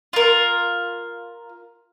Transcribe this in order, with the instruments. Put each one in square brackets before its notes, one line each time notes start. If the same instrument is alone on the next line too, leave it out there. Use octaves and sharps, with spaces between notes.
[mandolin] F4 A#4